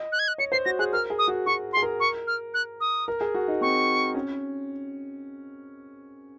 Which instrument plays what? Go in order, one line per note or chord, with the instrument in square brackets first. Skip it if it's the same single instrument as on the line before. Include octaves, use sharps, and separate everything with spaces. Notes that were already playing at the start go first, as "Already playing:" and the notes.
Already playing: [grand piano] D#5
[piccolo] F#6
G#6
F#6
[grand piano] C#5 [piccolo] C#7
[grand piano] C5 [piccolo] C7
[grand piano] F#4 [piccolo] A#6
[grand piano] G#4 [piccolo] F#6
[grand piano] A#4 [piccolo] F6
[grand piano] G#4
[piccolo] D#6
[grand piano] F#4
[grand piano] F#4 [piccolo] C#6
[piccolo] C6
[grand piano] G#4
A#4
[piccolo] C#6
F6
F#6
D#6
[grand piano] A#4
G#4
F#4
D#4
[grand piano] C4 [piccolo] C#6
[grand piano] C#4